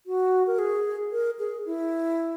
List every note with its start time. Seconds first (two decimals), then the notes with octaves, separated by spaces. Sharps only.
0.06 F#4
0.47 A#4
0.58 G#4
1.12 A#4
1.39 G#4
1.65 E4